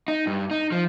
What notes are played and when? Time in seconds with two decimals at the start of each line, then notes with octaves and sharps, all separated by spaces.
0.08 D#4
0.27 G2
0.51 D#4
0.72 F3